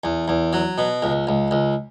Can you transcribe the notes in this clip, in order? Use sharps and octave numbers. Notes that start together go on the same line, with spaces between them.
E2
E2
F#3
B2
C#2
C#2
C#2